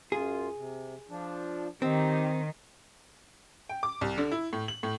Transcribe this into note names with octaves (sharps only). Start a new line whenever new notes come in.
F#2 F4 G#4
C3
F3 D4
D#3 C4 D#4 G4
G5
D6
C2
D3
E4
A2
F#7
A2